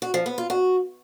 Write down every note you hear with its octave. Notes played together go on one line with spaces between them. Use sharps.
F#4
F3
B3
F4
F#4